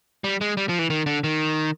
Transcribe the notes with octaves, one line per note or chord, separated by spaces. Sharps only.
G3
G#3
G3
F3
E3
D#3
D3
D#3